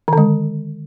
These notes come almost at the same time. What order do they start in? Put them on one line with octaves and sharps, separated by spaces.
D#3 D3 G#3